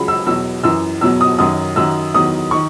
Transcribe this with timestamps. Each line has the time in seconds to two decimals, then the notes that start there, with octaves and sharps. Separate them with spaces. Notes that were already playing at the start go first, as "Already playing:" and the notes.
Already playing: C#2 C#3 F#3 B5
0.08 E6
0.26 E2 B2 F#3 E6
0.64 F#2 E3 E6
1.01 E2 B2 F#3 E6
1.21 D#6
1.39 F#2 D#3 F#3 D#6
1.76 F#2 D#3 F#3 E6
2.14 E2 D#3 F#3 D#6
2.51 D#3 C#6